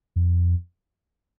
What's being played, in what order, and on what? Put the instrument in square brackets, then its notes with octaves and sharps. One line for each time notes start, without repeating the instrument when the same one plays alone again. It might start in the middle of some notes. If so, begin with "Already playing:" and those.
[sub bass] F2